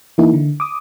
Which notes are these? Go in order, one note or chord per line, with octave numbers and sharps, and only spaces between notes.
E3 A#3 D#4 E4
D3
D6 D#6